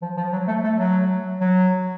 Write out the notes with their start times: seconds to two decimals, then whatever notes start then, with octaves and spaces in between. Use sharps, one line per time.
0.02 F3
0.17 F3
0.32 F#3
0.47 A3
0.64 A3
0.79 F#3
1.41 F#3